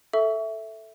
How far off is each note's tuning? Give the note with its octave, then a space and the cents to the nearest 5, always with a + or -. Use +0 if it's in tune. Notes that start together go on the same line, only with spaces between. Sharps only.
A4 +0 E5 +0 C#6 +30